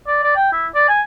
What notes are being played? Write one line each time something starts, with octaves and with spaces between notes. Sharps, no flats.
D5
D5
G5
E4
D5
G#5